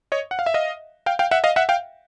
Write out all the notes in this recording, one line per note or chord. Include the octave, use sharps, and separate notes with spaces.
C#5 D#5
F#5
F5
E5
D#5 F5
F5 G5
F5 G5
E5 F#5
D#5 F5
E5 F#5
F5 G5